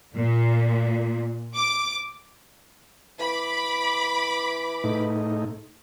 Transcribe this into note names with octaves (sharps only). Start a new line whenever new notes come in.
A#2
D6
E3 B5 D6
A2 D#4